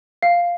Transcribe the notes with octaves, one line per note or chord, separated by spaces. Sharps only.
F5